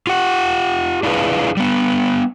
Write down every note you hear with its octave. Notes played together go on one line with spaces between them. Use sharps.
F4 G4 F#5
D4 E4 F4 G#4 B4
G3 B3